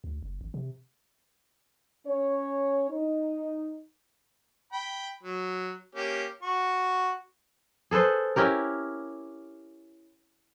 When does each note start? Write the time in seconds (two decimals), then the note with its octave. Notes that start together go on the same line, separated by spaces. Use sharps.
0.04 D2
0.22 F#1
0.41 G#1
0.54 C3
2.06 C#4 C#5
2.90 D#4
4.73 G5 B5
5.23 F#3
5.95 A#3 C#4 G4
6.43 F#4 C#6
7.91 G#4 A4 B4 C5
8.36 C#4 E4 G4 A#4